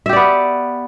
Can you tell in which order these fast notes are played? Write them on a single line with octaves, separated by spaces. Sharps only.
E5 G4 D5 B3